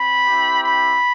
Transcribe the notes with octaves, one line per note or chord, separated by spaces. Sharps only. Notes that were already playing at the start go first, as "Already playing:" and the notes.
Already playing: C4 B5
C4 E4 G4
B5